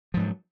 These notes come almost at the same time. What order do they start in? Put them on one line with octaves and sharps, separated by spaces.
F3 G#2 F#3